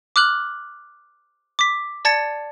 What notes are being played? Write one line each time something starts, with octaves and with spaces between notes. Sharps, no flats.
D6 F6 F#6 F#7
D6 B6
D5 A5 G#6 A6 C#7